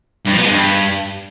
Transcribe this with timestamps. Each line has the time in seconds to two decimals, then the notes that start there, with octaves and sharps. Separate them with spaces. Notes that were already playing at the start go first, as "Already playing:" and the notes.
0.26 G2
0.32 F3
0.38 B3
0.45 G#3
0.51 G2